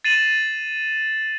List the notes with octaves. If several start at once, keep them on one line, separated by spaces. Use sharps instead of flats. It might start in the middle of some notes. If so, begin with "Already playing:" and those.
A6 C7 D#7 E7 F#7